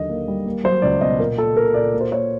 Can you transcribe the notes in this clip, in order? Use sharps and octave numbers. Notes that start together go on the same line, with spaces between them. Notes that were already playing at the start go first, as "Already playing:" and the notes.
Already playing: D#2 D3 F#3 D#5
A#3
G3
A#3
F#3 C5
C#2 D5
B2 D#5
A#2 A#4
A#2 A4
A#2 A#4
A#2 D5
A#3
C5
A#3 C#5